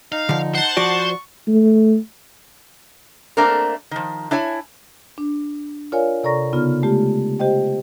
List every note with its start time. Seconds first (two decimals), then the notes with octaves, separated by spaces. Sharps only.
0.12 D#4 F5
0.29 D3 F3
0.55 C5 F#5 A5
0.77 F3 F#4 D5 C#6
1.48 A3
3.37 A3 A#3 C4 D4 A#4
3.91 D#3 F3
4.31 D4 E4 C#5 G#5
5.18 D4
5.92 F4 A#4 C#5 D5 F5 G#5
6.24 C3 A4 D5 A#5 C#6 A#6
6.53 C#3 B3 D#4 F4 F6
6.83 G#3 A3 F4 G4
7.39 G4 C5 D#5 G5